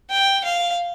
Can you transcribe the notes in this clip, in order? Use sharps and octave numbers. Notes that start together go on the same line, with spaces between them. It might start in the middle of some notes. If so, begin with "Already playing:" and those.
G5
F5